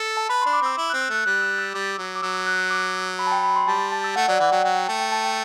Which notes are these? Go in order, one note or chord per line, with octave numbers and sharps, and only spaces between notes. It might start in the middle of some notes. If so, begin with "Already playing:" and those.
Already playing: A4
A5
B4 B5
C6
D4
D6
C4 E6
E4 E6
F#6
C4
E6
A3 F#6
G3 F#6
E6
E6
G3 D6
F#3
D6
F#3 E6
F#6
E6
D6
B5
A5
G5
B5
C6
G3 A5
A5
E6
A3 F#5
F#3 D5
E3 F#5
F#3 G5
F#3 G5
G5
A3 A5
G5
A5
G5